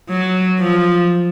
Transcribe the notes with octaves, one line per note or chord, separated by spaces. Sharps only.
F#3
F3